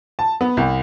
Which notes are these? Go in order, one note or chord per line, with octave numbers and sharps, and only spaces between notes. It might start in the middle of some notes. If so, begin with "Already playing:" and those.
A5
B3
C2